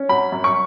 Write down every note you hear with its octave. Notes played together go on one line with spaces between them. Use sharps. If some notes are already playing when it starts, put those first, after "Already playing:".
Already playing: C#4
F#3 B5
F#2
C#6